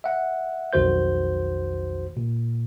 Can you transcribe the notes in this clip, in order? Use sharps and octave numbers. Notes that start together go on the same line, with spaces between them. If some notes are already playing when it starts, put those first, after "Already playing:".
E5 F#5
B1 F2 D#3 F#4 C5 G6
A#2